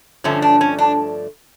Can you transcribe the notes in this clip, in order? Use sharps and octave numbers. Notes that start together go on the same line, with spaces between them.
G2 D3 F3 A3 C#4
D4
C#4
D4